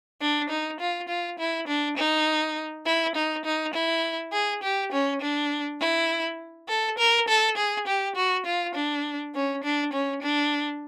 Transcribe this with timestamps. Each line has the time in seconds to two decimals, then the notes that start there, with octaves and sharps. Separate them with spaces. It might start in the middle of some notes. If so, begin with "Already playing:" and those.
0.21 D4
0.49 D#4
0.80 F4
1.08 F4
1.39 E4
1.67 D4
1.97 D#4
2.86 E4
3.15 D#4
3.45 D#4
3.74 E4
4.33 G#4
4.63 G4
4.92 C#4
5.21 D4
5.81 E4
6.69 A4
6.98 A#4
7.28 A4
7.57 G#4
7.87 G4
8.16 F#4
8.46 F4
8.75 D4
9.35 C#4
9.63 D4
9.93 C#4
10.22 D4